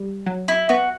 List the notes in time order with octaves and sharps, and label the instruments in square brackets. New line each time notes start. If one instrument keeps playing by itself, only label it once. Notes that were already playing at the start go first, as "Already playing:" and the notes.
Already playing: [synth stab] G3
F#3
[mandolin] E4
[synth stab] B3 [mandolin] F#4